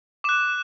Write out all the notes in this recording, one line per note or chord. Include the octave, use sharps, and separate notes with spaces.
D6 F#6 E7